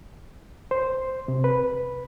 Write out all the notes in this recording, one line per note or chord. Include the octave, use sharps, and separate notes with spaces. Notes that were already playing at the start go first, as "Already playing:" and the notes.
C5
C3
B4